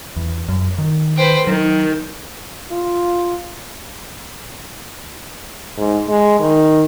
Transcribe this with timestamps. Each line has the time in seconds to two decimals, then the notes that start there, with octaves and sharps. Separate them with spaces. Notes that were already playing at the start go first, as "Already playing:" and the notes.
0.16 E2
0.49 F#2
0.78 D#3
1.16 B4 C5 G5
1.47 D#3 F#3
2.72 F4
5.77 G#2
6.09 G#3
6.40 D#3